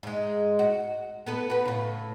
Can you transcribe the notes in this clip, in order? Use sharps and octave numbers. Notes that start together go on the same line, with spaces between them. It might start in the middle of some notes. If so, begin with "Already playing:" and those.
G#2 G#3
F#4
B3 A4 B4
F#4 B4
A2 C#3